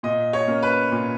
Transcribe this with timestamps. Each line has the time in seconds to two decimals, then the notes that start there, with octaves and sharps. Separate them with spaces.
0.03 A#2 D#5
0.33 C#5
0.48 A#3 C#4
0.63 B4
0.92 A#2